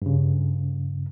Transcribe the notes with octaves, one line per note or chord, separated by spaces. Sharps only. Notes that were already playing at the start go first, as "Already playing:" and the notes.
G2 C#3